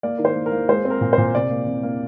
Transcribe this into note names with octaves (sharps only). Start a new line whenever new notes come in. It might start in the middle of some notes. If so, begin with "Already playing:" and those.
A#3 D5
D#3 A#4
C5
A#3
A#4
A#3
G#3 C5
C4
A#4
A#2
A#2 C5
C3 D5
A#3
C3
A#3